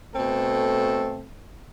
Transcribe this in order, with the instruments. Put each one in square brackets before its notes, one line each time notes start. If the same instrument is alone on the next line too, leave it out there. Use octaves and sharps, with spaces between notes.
[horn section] B2 A3 C4 A4